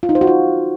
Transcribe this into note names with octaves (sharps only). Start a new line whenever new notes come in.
F4
D#4
C5
F#4
F4